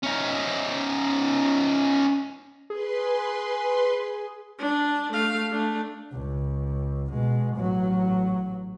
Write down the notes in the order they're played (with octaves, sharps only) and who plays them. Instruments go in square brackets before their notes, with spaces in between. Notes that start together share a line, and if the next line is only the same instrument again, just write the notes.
[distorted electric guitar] C#4 D#4
[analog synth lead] G#4 [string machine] B4 C6
[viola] D4
A3 F5
A3 D4
[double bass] C#2
B2 G#3
A1 F#3